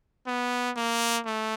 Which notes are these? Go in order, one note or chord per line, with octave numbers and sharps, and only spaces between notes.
B3
A#3
A3